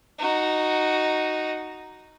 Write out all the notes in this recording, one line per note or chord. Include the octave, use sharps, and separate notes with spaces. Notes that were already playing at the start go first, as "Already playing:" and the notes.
D#4 F#4